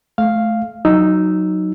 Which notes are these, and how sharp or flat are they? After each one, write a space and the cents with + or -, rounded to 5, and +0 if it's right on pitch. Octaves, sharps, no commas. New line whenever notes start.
A3 -25 F5 +0
F#3 +0 D#4 +0 E6 +0